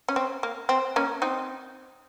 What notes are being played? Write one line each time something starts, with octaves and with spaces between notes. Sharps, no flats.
C#4
C4
A#3
C4
A#3 C#4
C4 D#4